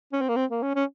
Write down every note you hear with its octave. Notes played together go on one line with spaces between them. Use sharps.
C#4
C4
A#3
C4
A#3
C#4
C#4